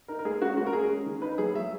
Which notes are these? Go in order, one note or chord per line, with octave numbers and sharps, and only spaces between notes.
D#4 A#4
A#4
G#3 G#4
C#4 F#4
G#3 F#4
A#4
G#3 G#4
C#4
D#3
D#4 B4
F#3 G#4
F#3 E5